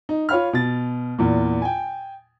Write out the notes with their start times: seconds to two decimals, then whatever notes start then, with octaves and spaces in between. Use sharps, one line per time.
0.09 D#4
0.29 F4 C#5 F5 B5 F6
0.53 B2 A6
1.18 E2 A#2
1.62 G5 G#5